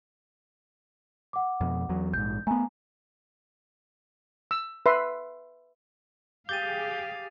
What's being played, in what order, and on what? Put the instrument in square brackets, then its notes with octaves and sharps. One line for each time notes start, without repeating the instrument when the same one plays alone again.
[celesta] F#5 D6
[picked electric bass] F2 B2
E2 F#3
[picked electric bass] A#1 G#2 [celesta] G6
[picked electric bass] A3 B3 [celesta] G#5 A#5
[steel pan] E6
B4 E5 C6
[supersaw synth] G4 G#4 [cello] F5 [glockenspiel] D6 A6 D#7 [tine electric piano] G6